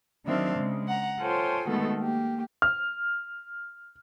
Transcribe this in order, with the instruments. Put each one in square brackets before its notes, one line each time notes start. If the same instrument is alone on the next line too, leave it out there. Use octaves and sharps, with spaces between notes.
[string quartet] D#3 F#3 C4 D4 E5 F5
C#3 G#3
F#5 A#5
F4 A4 C5 C#5 G5 G#5
B2 D#3 G#3 A3 B3 A4
A#3 G4
[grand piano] F6